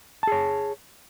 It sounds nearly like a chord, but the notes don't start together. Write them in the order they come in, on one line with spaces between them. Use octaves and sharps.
A5 G#4 C#5